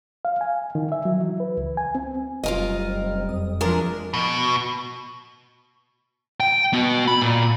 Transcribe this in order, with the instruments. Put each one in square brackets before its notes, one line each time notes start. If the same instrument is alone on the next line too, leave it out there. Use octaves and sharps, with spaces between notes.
[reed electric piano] F5
G#5
D#3
E5
F#3
E3
B4
C#2
G#5
C4
[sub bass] F1 [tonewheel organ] F#2 G3 C4 [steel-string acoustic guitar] F4 A#4 D#5
[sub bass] F2 [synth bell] D#6
[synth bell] F3 F4 A6 [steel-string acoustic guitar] G#3 D4 A#4 [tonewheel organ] E5
[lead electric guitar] B2
G5
B3 F#4
B5
A#2